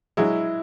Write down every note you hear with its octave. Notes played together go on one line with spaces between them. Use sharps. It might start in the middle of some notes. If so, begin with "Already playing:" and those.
F#3 G#3 E4